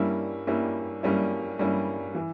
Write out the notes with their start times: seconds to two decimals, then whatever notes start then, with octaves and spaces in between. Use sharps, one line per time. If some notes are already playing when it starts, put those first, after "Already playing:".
Already playing: G2 G3 A#3 C#4 E4
0.47 G2 G3 A#3 C#4 E4
1.03 G2 G3 A#3 C#4 E4
1.59 G2 G3 A#3 C#4 E4
2.15 E3